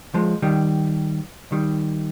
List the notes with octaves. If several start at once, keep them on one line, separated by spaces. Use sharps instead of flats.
F3 G#3
D#3 G3
D#3 G3